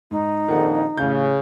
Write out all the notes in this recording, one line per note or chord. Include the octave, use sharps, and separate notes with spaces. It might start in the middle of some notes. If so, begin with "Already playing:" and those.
G#2 D#4
A#1 F2 D#3 F#5
A1 C#3 F5 G6